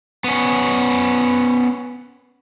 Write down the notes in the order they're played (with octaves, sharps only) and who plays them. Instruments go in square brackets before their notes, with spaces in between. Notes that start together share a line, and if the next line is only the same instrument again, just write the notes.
[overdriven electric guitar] B3 C#4